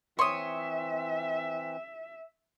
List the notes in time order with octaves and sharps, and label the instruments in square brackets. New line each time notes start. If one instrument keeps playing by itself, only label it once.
[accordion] E3 C4 [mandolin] C#5 D#6 [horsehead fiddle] E5 [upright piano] C6